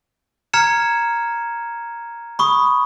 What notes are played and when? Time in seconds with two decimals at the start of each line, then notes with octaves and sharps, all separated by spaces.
0.53 A#5 F6 G#6 C#7 E7
2.39 B5 C#6 D#6